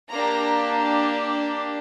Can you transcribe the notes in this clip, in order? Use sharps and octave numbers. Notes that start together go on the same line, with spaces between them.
A#3 D4 G4 A#5